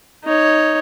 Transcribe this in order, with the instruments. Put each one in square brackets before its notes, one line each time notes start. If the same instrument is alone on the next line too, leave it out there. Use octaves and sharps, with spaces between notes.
[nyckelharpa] D#4 C#5